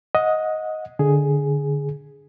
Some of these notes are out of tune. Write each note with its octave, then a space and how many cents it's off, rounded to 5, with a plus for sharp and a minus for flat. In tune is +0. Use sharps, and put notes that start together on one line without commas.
D#5 +10 F#5 -20
D3 +0 G#4 +0